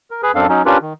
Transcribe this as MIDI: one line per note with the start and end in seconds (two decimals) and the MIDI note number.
0.11 0.21 70
0.23 0.32 68
0.23 0.32 71
0.35 0.47 42
0.35 0.47 60
0.35 0.47 62
0.35 0.47 69
0.35 0.47 77
0.49 0.62 54
0.49 0.62 61
0.49 0.62 63
0.66 0.78 61
0.66 0.78 62
0.66 0.78 65
0.66 0.78 67
0.66 0.78 70
0.66 0.78 71
0.82 0.93 51